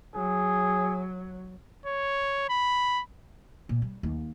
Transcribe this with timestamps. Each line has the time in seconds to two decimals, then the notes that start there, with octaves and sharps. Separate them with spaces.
0.15 F#3 G#4
1.86 C#5
2.50 B5
3.69 A#2
3.82 G3
4.03 D#2